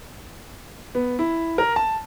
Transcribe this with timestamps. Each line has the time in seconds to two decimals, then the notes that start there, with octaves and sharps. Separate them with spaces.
0.95 B3
1.19 E4
1.58 A#4
1.76 A5